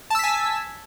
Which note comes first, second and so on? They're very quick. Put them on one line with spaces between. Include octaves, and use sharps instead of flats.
A5 E6 B6 G#5